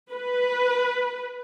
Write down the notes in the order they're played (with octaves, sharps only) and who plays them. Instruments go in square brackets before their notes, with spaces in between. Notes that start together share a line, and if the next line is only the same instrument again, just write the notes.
[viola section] B4